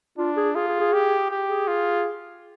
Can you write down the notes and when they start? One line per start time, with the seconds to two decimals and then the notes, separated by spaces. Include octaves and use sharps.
0.18 D4 F4
0.37 G#4
0.55 F4 G#4
0.68 G#4
0.80 G#4
0.93 G4
1.31 G4
1.49 G#4
1.68 F4